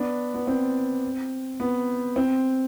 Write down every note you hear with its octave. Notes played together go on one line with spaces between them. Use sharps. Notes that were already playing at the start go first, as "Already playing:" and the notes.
Already playing: B3 D4
B3
C4
B3
C4